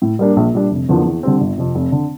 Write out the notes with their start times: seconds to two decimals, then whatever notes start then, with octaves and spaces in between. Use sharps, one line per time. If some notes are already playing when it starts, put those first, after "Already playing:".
0.02 A2
0.19 G3 A#3 D4
0.36 A#1
0.54 A#2 G3 D4
0.71 F1
0.89 E2 D3 F3 A#3
1.05 E2
1.23 D3 G3 C4
1.40 G1
1.58 F2 C3
1.75 F1
1.92 D3